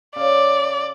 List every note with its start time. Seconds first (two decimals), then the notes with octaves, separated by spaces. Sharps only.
0.16 C#3 D5